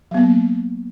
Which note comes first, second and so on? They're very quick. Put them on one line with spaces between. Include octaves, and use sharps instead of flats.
F#3 B3 A#3